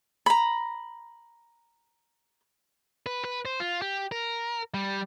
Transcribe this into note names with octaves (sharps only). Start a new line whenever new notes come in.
A#5 B5
B4
B4
C5
F4
G4
A#4
G3